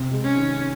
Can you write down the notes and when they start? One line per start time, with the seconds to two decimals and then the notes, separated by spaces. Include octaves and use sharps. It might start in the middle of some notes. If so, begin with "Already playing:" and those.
Already playing: C3
0.12 G#3
0.24 C#4
0.37 D#3